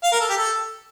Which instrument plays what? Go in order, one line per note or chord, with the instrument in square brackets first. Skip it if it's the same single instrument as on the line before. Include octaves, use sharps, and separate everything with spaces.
[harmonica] F5
A#4
A4
G4
A4